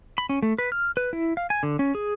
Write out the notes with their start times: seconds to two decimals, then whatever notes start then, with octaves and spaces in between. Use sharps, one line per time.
0.18 B5
0.29 C#4
0.43 A3
0.58 B4
0.72 F6
0.97 B4
1.13 E4
1.37 F5
1.50 G#5
1.63 D3
1.79 C#4
1.95 G#4